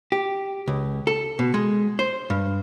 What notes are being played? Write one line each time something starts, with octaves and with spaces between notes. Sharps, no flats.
G4
C#2
A4
B2
G#3
C5
G2